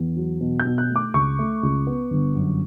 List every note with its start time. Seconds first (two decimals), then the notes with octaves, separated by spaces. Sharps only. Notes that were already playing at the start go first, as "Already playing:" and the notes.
Already playing: E2
0.16 F#3
0.41 B2
0.60 G6
0.65 B2
0.78 F#6
0.90 A3
0.96 D6
1.14 C#2 C#6
1.39 A3
1.63 C#2
1.87 B3
2.11 G1
2.35 F#2